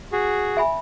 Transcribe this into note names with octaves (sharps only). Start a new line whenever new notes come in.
F#4 G#4
E5 G#5 B5